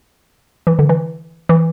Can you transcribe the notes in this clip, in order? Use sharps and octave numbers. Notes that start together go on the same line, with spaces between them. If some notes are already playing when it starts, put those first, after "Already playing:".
E3
D3
E3
E3